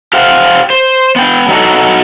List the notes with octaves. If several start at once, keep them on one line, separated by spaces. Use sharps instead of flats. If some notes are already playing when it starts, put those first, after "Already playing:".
G4 C5 F5 F#5
C5
B3 G5
F#3 B3 D#4 E4 F#4 A4